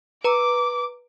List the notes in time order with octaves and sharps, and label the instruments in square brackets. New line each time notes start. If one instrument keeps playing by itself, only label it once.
[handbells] B4 A#5 [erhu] D6